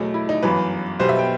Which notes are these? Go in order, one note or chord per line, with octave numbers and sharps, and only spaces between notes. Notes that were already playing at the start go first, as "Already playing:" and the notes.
Already playing: E2 B2 F#3 A3
E4
D#4
G1 F#2 E3 B4
B1 B2 G3 B3 C5
E5
G5